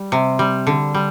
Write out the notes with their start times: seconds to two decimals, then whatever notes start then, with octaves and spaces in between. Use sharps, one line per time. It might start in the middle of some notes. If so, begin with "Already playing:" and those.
Already playing: G3
0.12 C3
0.39 G3
0.67 D3
0.94 G3